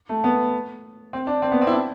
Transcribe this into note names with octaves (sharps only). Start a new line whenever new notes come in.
A3
B3
C4
D4
C4
B3
C4
E4
D4